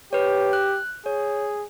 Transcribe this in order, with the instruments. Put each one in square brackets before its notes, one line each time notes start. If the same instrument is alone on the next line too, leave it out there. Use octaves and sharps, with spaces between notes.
[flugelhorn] G4 [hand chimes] B4 C#5
[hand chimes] F#6
[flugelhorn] G#4 [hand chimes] C#5